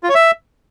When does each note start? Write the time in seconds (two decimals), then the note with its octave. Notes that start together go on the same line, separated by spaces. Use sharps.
0.03 F4
0.09 C#5
0.15 E5